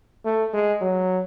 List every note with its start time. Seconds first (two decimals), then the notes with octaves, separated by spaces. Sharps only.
0.25 A3
0.53 G#3
0.81 F#3